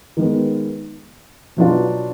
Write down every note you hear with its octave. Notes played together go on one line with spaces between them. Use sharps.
D#3 G#3 B3
B2 F#3 B3 D4 F4